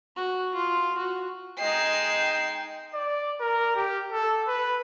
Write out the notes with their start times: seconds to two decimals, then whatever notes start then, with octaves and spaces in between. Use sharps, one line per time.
0.16 F#4
0.55 F4
0.98 F#4
1.59 G#3 D#4 D#5 G5 C7 E7
2.94 D5
3.41 A#4
3.76 G4
4.12 A4
4.48 B4